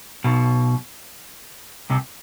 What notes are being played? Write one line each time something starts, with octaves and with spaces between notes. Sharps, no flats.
B1 B2
C2 C3